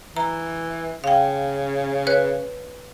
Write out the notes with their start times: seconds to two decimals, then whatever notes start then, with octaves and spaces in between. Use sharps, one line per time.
0.17 E3 A#5
1.04 C#3 F5 G5
2.07 B4 C#5 F#6